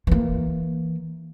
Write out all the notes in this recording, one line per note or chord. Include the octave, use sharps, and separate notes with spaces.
E3 A#3